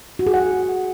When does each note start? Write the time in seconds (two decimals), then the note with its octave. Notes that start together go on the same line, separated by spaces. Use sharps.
0.19 F#4
0.26 G#4
0.34 F#5